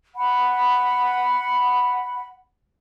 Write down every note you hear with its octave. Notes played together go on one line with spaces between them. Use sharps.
F#5 B5